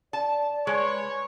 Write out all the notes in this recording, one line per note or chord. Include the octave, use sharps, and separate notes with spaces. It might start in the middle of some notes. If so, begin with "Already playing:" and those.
D5 A5
G#3 B4 C#5